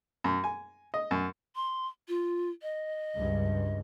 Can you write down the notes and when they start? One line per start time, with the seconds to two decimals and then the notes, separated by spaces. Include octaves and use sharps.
0.24 F#2
0.44 G#5
0.94 D#5
1.11 F#2
1.56 C6
2.08 F4
2.62 D#5
3.15 C#2 G2